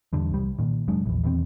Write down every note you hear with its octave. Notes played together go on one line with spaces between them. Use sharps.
E2 G2 D3
C2 G3
A#2 D#3
F1 F#3 G#3 D4
A#1 E2
D#1 E2 B2 C4